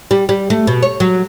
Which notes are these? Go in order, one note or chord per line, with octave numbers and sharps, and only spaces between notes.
G3
G3
A3
B2
C#5
F#3